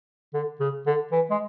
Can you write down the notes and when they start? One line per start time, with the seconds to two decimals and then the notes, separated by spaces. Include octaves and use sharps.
0.34 D3
0.60 C#3
0.86 D3
1.12 E3
1.30 G#3